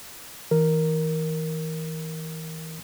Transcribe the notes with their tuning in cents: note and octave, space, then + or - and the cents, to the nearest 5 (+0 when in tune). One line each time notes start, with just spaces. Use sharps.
E3 -35 A#4 +0